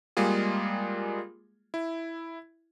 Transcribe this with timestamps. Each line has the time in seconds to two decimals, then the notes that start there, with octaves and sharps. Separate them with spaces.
0.17 G3 G#3 A#3 F4 G#4
1.74 E4